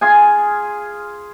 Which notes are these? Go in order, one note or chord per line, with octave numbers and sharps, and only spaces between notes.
F4 G#4 G#5